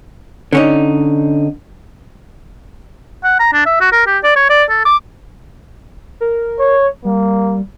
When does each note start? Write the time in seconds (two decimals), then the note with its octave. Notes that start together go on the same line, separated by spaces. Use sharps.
0.53 D3 C#4 D#4
3.24 F#5
3.39 A#5
3.53 D4
3.66 E5
3.81 F#4
3.92 A#4
4.07 G4
4.24 D5
4.36 C#5
4.50 D5
4.70 A4
4.85 D6
6.21 A#4
6.59 C#5
7.05 G3 A#3